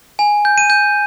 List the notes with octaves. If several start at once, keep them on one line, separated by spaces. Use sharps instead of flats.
G#5
G6
D#7
G6